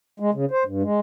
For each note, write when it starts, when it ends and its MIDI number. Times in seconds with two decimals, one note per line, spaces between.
0.20 0.31 56
0.34 0.45 49
0.51 0.64 72
0.65 0.83 43
0.83 1.00 56